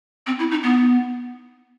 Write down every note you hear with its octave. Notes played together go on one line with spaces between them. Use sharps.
C4
E4
D#4
B3